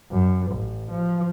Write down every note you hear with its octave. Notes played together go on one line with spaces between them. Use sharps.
F#2
A1
F3